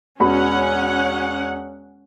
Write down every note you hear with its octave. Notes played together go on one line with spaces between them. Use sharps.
E1 C#4 F#4 F#5 B5